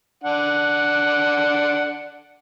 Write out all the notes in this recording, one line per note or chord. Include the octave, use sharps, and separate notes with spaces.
D4 F#5